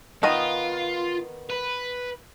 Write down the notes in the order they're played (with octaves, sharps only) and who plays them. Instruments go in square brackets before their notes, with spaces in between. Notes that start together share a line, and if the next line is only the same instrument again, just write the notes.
[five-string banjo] D#3 B3 D#5 [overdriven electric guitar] F4
[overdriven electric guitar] B4